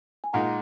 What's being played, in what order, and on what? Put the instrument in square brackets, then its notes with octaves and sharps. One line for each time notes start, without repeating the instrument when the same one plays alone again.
[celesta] G#5
[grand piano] A#2 G#3 D#4 [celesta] F#5 A#5